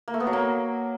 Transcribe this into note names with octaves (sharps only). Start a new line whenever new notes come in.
A#3
A3
B3
F#3
A#3